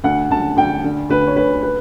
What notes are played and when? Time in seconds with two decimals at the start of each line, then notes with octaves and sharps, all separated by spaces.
0.04 D2 F#5
0.30 D2 A5
0.57 D2 G5
0.84 D3
1.10 D2 B4
1.27 C#5
1.36 D2 B4
1.63 B4